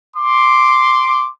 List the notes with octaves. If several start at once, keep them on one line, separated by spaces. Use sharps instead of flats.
C6 D6